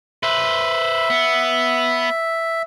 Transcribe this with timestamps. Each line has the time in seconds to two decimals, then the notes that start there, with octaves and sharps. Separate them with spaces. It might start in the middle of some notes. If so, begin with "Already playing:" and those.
0.23 B4 C5 E5
1.10 B3